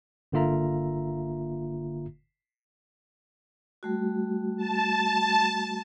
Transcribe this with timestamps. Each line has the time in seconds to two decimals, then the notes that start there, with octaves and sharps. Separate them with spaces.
0.32 G1 D3 A#3 F4 E5 A#5
3.83 G3 A3 F#4
4.57 A5